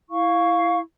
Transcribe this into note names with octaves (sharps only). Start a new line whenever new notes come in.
E4 F5 C#6